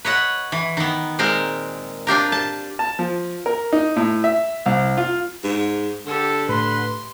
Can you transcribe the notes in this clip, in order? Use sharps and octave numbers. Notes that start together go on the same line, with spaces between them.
B4 C#5 D#5 F#5
E3
D#3 B3
A#2 G#3 C4 A#4
D4 F4 G4 A#4
A5
A5
F3
A#4
D#4
A2
E5
C2
F4
G#2
D3 G4 A4
A2 B4 C6